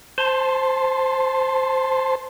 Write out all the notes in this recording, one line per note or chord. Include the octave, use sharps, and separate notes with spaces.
C5 A5 C6